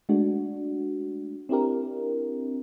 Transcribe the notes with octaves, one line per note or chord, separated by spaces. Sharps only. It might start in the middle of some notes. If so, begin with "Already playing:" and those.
G#3 A3 D4 F#4
C4 D4 E4 G4 A#4